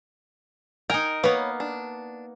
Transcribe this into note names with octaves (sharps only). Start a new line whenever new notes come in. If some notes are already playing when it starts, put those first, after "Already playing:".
D#4 A#4 G5 G#5
A#3 B3 B4 C#5
D4